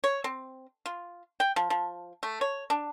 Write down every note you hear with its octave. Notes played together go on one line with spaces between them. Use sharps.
C#5
C4
F4
G5
F3
F3
A3
C#5
D4